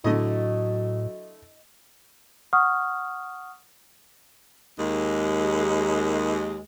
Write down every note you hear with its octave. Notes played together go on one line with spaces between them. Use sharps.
A2 D3 F#3 A3 E4 D#5
F#5 C#6 D#6 F6
D#2 G#3